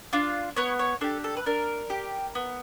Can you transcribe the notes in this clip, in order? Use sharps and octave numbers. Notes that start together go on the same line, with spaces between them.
D4 F4
B3 C#5
C#5
D4 G4 A4
A4
B4
D4 A#4
G4
B3